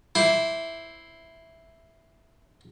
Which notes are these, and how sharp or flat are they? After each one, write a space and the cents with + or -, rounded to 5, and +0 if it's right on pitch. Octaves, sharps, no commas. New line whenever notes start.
E4 +0 C5 +0 D6 -10